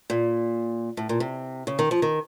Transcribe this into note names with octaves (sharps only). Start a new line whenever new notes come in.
A#2
A2
A#2
C3
C#3
D#3
F3
D#3